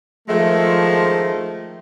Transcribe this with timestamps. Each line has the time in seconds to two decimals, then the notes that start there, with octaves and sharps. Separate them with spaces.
0.29 D#3 F3 G#3 A3